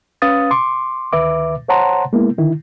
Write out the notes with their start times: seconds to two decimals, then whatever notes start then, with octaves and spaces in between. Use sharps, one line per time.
0.22 C#4 B4 F5 D#6 A6
0.51 C6 D6
1.13 D2 D#3 B4 E5 D6
1.68 C5 C#5 F#5 A5 A#5 C6
2.13 G#3 A#3 B3 E4
2.38 D3 D#3 E4